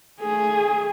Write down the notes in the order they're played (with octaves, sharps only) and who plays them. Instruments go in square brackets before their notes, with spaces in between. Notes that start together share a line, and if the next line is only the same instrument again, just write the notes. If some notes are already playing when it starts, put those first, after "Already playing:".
[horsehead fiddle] A3 G#4